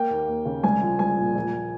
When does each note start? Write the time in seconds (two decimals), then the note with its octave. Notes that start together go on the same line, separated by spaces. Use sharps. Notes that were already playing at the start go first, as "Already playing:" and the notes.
Already playing: A#3 G5
0.10 D#2
0.28 D#2
0.45 C#3
0.63 C2 G#5
0.81 F3
0.99 C2 G#5
1.18 A#2
1.35 A#1